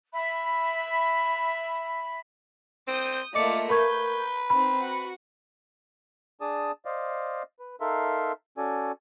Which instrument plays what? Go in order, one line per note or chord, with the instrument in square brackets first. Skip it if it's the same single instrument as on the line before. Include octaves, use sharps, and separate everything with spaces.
[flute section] E5 B5
[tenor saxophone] C4 [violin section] D#6 G6
[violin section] A3 A#3 F4 [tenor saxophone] D5 [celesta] D#5 D6 C#7
[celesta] A#4 C#6 G#6 [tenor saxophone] B4 [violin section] G6
[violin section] C4 D#4 [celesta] B5
[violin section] F#4 F#5
[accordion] D4 G#4 D5 A5 D#6
C5 D5 D#5 F5
B4
D#4 A4 A#4 E5 F5 C6
C#4 F#4 A4 D5 G#5